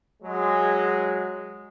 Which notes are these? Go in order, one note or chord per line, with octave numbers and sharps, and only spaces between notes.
F#3 G#3